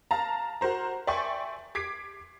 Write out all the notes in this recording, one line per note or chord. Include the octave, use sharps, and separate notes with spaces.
F5 A5 A#5
F#4 A#4 C5 A#5
D5 E5 G5 G#5 C6 C#6
D6 G#6 B6 C7 D7